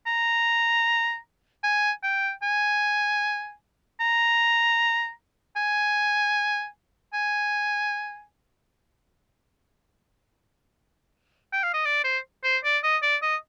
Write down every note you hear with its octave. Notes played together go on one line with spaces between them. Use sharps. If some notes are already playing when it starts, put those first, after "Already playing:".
A#5
G#5
G5
G#5
A#5
G#5
G#5
G5
F5
D#5
D5
C5
C5
D5
D#5
D5
D#5